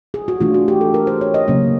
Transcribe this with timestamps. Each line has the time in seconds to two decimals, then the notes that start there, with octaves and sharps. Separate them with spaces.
0.14 G#4
0.28 F#4
0.40 E3 A3 D4 F4
0.54 F#4
0.68 G4
0.81 A4
0.94 A#4
1.07 C5
1.21 C#5
1.34 D#5
1.48 C#3 F#3 A#3 C#4